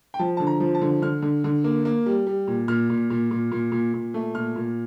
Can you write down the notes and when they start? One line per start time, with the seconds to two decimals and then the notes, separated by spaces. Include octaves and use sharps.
0.14 G5
0.19 F3 A5
0.37 D3 A5
0.47 A#5
0.60 F3
0.74 A5
0.81 D3
1.02 D3 F6
1.22 D3
1.44 D3
1.64 A#3
1.85 A#3
2.06 G3
2.27 G3
2.47 A#2
2.68 A#2 F6
2.90 A#2
3.10 A#2
3.31 A#2
3.52 A#2
3.72 A#2
3.94 A#2
4.14 A3
4.35 A#2 F6
4.56 A#2